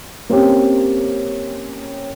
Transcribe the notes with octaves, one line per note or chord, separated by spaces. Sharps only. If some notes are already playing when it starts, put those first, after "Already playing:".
A#3 C4 C#4 G4